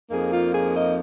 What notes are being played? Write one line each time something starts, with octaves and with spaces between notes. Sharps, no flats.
F2 F3 A#3 D#4 G#4
F4
G#4
D#5